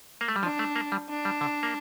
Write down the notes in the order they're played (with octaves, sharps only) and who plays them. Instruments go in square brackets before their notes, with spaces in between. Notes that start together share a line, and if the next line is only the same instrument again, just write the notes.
[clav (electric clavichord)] A#3
A3
G3
[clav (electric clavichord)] F3 [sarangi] D4
[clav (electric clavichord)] A3
A#3
G3
[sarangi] D4
[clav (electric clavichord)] G3
D3
A#3